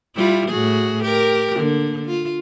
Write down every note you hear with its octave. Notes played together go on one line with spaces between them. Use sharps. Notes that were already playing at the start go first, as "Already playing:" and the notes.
G3 E4 F4
A2 F#4 G#4
G4 A#4
D3 A#3
F4